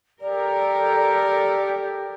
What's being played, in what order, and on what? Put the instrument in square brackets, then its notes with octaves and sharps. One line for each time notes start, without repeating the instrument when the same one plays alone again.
[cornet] G4 [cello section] A4 A#4 [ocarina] D5